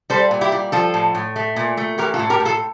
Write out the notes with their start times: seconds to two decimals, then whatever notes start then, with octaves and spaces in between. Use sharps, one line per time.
0.10 G3 A4 C5
0.31 A#2
0.41 E4 G4
0.52 G3
0.72 F3 F4 A4
0.94 A2
1.15 A2
1.36 A3
1.56 A#2
1.77 A3
1.98 E3 G4 A#4
2.14 F4 A4
2.19 A2
2.30 G4 A#4
2.40 A2
2.45 F4 A4